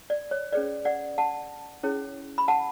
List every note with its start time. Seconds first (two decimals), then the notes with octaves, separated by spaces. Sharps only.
0.10 D5
0.31 C#5
0.53 C#4 G#4 B4 D5
0.85 D5 F#5
1.18 F#5 A5
1.83 C#4 E4 G#4 C#5
2.38 B5
2.48 F#5 A5